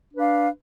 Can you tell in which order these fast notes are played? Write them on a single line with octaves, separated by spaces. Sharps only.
D4 B4 F5